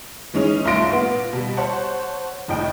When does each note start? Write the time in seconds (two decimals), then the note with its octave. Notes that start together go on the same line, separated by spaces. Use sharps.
0.34 E3 G#3 C#4 D#4
0.65 C2 A3 F4 C6 A#6 D7
0.91 A#2 B3
1.33 B2 G3
1.57 C5 C#5 F#5 A5
2.48 F1 A2 D#5 G5